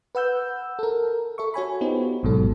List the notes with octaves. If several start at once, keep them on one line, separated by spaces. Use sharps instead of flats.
B4 F#5 E6 G6
A4 A#4
A4 E5 C#6
F#4 C#5 G#5 B5
B3 D#4 F4 G4 C5
A1 G#2 B2 F#3 A4